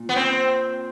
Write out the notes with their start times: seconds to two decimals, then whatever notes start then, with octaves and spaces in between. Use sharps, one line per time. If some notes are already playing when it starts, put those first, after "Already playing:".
Already playing: A#2
0.09 B3
0.16 C4